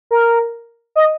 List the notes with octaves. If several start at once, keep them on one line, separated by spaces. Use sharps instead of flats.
A#4
D#5